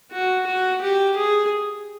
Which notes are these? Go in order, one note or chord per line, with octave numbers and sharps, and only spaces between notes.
F#4
F#4
G4
G#4